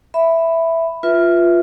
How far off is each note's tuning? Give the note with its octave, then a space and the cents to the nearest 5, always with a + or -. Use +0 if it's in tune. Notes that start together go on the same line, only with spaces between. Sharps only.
E5 +0 B5 +5
F4 +0 B4 -10 E5 +0